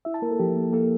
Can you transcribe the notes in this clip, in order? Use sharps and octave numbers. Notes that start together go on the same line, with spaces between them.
E4 E5
A5
A#3 A#4
A4
F3 G4
A#3
A#3 A4